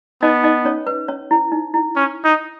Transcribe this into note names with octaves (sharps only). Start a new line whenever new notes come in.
B3 D#4 D#5
D#4 D#5
C#4 C#5
B4
C#4 C#5
E4
D#4
E4
C#4
D#4